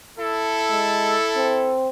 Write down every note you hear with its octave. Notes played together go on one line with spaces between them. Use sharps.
E4 A4
G#3
C4